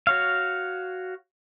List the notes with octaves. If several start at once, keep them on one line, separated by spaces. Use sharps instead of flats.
F#4 C#5 F5